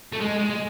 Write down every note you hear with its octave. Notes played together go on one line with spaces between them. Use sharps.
A3
G#3
G#3
G#3